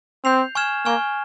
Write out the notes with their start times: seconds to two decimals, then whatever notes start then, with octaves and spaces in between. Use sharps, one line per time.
0.25 C4 G6 C7 F7
0.55 G#5 C#6 F6 G#6 E7
0.85 A#3 G#5 C#6 F6